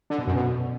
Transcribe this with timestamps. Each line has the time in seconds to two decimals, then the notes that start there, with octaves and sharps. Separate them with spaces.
0.10 D3
0.19 B2
0.27 F#2
0.35 B2